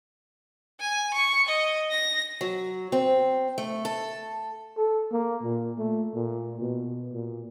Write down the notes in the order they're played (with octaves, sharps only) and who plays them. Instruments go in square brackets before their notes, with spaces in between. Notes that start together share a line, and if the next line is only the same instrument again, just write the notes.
[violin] G#5
C#6
D#5
A#6
[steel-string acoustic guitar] F#3
C4
A3
A4
[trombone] A4
A#3
A#2
A3
A#2
B2
A#2